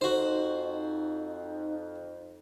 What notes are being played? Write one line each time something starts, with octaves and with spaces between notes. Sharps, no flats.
F2 D#4 F#4 C5